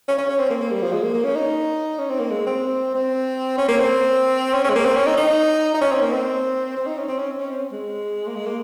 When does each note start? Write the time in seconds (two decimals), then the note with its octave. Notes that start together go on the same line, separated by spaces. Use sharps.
0.08 C#4
0.18 C#4
0.29 C#4
0.39 C4
0.50 A#3
0.61 A#3
0.72 G3
0.82 F3
0.93 G#3
1.03 A#3
1.14 A#3
1.24 C#4
1.36 D#4
1.99 C#4
2.10 C4
2.20 A#3
2.31 G#3
2.47 C4
2.95 C4
3.58 C#4
3.69 A#3
3.80 C4
4.54 C#4
4.64 C#4
4.70 G#3
4.75 A#3
4.85 C4
4.96 C#4
5.07 D#4
5.17 D#4
5.74 D#4
5.81 C#4
5.92 C4
6.02 A#3
6.12 C4
6.77 C4
6.87 D#4
6.98 C#4
7.08 C4
7.19 C#4
7.40 C#4
7.51 C4
7.72 G#3
8.27 A#3
8.35 G#3
8.46 A#3